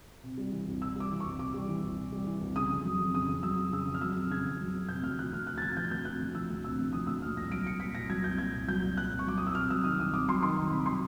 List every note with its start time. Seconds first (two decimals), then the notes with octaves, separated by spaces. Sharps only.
0.23 C3
0.38 G3
0.52 E3
0.67 C2
0.81 C3 E6
0.96 G3 D6
1.11 E3
1.20 C#6
1.25 C2
1.39 C3 D6
1.54 G3
1.69 E3
1.83 C2
1.98 C3
2.12 G3
2.26 E3
2.41 C2
2.56 C#3 D#6
2.70 F2
2.85 F#3
3.00 F2
3.14 C#3 D#6
3.29 F2
3.43 F#3 E6
3.59 F2
3.72 C#3 E6
3.87 F2
3.94 F6
4.01 F#3 E6
4.16 F2
4.30 C#3 G#6
4.45 F2
4.60 F#3
4.75 F2
4.89 C3 G6
5.03 D2 F6
5.19 F3 F#6
5.32 D2 F6
5.47 C3 F#6
5.58 A6
5.61 D2 G#6
5.77 F3 G6
5.91 D2 G6
6.05 C3 F#6
6.20 D2
6.35 F3 E6
6.50 D2
6.64 C3 E6
6.79 D2
6.93 F3 D#6
7.07 D2 E6
7.22 A#2 F6
7.37 C2 A#6
7.51 F#3 D7
7.66 C2 C#7
7.80 A#2 B6
7.95 C2 A#6
8.09 F#3 G#6
8.24 C2 G6
8.38 A#2 G#6
8.54 C2
8.68 F#3 G6
8.83 C2
8.97 A#2 F#6
9.11 C2
9.19 C#6
9.27 F#3 D6
9.38 C2 D#6
9.47 E6
9.55 C3 F6
9.70 F#3 E6
9.84 D#3 D#6
10.00 C2 D#6
10.13 C3 D6
10.28 F#3 C6
10.43 D#3 C6
10.57 C2 A#5
10.72 C3 B5
10.86 F#3 C6